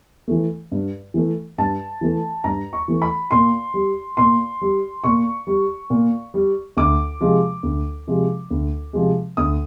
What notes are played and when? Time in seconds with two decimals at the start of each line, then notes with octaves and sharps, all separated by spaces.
0.28 E3 A3
0.72 G2
1.14 E3 A3
1.58 G2 A5
2.01 E3 A3
2.44 G2 A#5
2.73 C#6
2.88 E3 A3
3.02 B5
3.31 A#2 C6
3.74 G3
4.17 A#2 C6
4.62 G3
5.04 A#2 C#6
5.47 G3
5.90 A#2
6.34 G3
6.77 D2 D6
7.21 C3 F3 G#3
7.63 D2
8.08 C3 F3 G#3
8.51 D2
8.93 C3 F3 G#3
9.37 D2 D#6